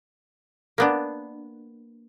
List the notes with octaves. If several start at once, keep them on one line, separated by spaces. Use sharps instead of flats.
A#3 B3 D4